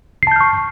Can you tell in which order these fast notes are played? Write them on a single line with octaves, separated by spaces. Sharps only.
C7 A5 G6 F6 C#6